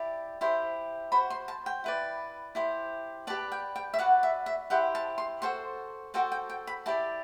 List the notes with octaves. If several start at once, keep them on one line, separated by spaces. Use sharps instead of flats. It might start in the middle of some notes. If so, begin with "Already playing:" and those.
Already playing: E4 G4 D5
E4 G4 C5
F#4 C5 B5
C6
A5
G5
E4 B4 D5
E4 G4 C5
G4 B4 D5 A5
G5
G5
E5
F#4 B4 D5 F#5
E5
E5
E4 G4 C5 F#5
A5
C6
F#4 A4 C5 C6
F#4 A4 C5 G5
G5
G5
B5
E4 G4 D5 A5